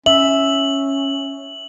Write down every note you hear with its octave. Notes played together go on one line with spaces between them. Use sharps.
C#4 E5 F#7